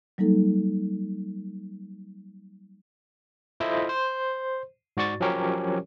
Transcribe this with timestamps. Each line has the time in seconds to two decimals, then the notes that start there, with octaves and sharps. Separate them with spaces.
0.18 F#3 G3 A#3 D#4 A4
3.60 E4 F4 A4 C5 D#5 E5
3.89 C5
4.97 G#2 F#4 D5 C#6 A6
5.21 F3 F#3 C#4 G4 A#4 C#5